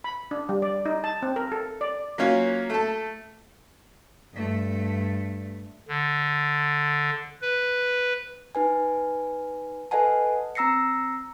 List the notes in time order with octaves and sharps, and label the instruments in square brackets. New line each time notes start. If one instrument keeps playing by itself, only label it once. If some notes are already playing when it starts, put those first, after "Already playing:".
[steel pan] B5
D4
G3
D5
D#4
A5
C4
A#4
A4
D5
[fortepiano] F#3 A#3 C#4 F4
A3 A4
[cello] G2 A3
[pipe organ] D3
B4
[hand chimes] D#4 B4 G#5
A4 B4 D#5 F#5 G#5 A5
C4 A#5 E6 A#6 C7 C#7